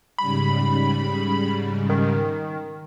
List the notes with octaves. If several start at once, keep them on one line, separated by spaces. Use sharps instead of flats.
G#2 C#3 G3 B5
D#3